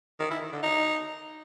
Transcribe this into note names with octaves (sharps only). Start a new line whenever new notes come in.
D#3
E4
D#3
D3
D#4